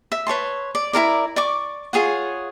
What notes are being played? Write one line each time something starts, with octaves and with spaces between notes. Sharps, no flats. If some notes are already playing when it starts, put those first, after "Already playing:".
E5
B4 C#5 A5 C6
D5
E4 F4 A#4 D5
D5 C#6 D6
F4 G#4 C#5 F#5